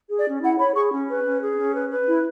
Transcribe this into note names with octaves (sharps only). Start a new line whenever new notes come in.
G#4
D5
C#4
E4 F#5
C#5 B5
G#4 C#6
C#4
B4
C#4
G#4
C#4
B4
B4
E4